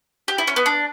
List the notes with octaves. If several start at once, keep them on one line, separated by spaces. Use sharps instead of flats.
G4
E4
C#4
B3
D4